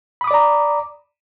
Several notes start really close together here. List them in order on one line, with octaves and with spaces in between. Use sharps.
B5 D#6 D6 D5 A#5